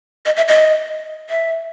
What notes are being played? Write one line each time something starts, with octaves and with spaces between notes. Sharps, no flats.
D#5
E5
D#5
E5